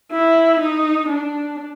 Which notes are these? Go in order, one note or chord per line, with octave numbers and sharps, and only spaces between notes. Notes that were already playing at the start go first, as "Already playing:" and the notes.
E4
D#4
D4